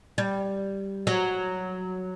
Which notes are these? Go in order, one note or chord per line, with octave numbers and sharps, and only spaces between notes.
G3
F#3